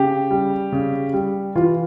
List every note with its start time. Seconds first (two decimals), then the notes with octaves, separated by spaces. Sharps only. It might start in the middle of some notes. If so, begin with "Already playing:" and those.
Already playing: C#3 G4
0.31 G3
0.72 C#3
1.14 G3
1.56 E3 F4